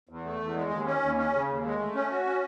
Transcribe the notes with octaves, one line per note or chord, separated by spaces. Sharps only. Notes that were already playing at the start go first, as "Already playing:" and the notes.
E2
A3
E2
G#3
D#2
C#4
D#2
C#4
C#3
D#2
G#3
A3
C#4
F#4
C#4